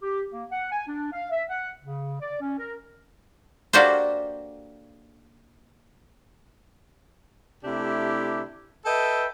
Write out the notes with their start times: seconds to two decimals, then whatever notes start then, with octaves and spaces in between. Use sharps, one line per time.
0.02 G4
0.31 A#3
0.51 F#5
0.72 G#5
0.87 D4
1.12 F5
1.31 E5
1.50 F#5
1.82 C#3
2.21 D5
2.41 C#4
2.58 A#4
3.73 A#3 D4 F#4 G4 A4 C5
7.63 C3 A3 D4 E4 G4
8.85 A4 B4 D#5 E5 G5